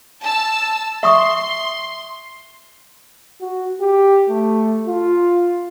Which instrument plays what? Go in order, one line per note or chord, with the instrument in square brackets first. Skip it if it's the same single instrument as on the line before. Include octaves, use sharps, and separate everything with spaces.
[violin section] A5 E6
[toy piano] E5 C#6 D#6 [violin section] C6
[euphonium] F#4
G4
A3
F4